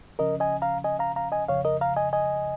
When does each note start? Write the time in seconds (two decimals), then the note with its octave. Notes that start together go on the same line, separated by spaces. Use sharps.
0.19 C#3 F3 C#4 A#4 D#5
0.40 D#5 G#5
0.62 F5 A#5
0.84 D#5 G#5
0.99 F5 A#5
1.16 F5 A#5
1.32 D#5 G#5
1.48 F2 C#3 F3 C#5 F5
1.65 A#4 D#5
1.81 F5 A#5
1.96 D#5 G#5
2.13 D#5 G#5